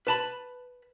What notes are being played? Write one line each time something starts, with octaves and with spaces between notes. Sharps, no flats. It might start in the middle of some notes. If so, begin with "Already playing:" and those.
B4 A5 B5